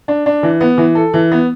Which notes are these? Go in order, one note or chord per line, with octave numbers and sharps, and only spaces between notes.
D4
D4
E3
B3
E3
A4
E3
B3